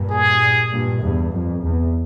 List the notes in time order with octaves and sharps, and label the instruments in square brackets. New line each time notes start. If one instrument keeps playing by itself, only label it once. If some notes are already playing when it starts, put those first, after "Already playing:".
Already playing: [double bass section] G2 A#2
[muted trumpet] G#4
[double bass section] G2 A#2
E2 G2
F2
E2